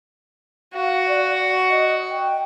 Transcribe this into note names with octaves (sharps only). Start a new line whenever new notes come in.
F#4 F5
D5
D#5
G5